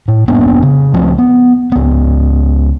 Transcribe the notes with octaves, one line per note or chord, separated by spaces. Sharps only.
A2
F1 A#3 B3 D4
C#3
C#2 F3 A3 C4
B3
C#2 B3